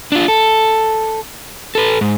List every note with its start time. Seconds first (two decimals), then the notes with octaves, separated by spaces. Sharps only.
0.12 D4 F4
0.28 A4
1.75 A4 B4
2.01 G#2